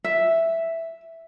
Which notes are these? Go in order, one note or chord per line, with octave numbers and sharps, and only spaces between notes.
E5